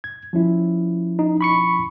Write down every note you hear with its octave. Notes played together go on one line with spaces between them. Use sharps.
G#6
F3 C#4 E4
D#4
B5 C#6 C#7